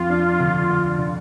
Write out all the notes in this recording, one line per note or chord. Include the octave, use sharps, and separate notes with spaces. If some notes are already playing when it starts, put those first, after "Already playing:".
Already playing: F2 F4
D4
D3
D3
D3